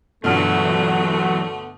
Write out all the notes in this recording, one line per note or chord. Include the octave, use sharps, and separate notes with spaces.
E2 G2 B2 D3 F#3 A3 B3 F6